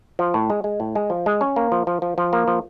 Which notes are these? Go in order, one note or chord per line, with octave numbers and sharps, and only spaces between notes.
F3
A2
G#3
G#3
A2
G#3
F3
G#3
C#4
A#3
F3
F3
F3
F3
A#3
F3